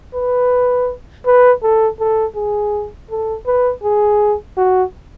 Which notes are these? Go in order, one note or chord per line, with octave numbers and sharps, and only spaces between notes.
B4
B4
A4
A4
G#4
A4
B4
G#4
F#4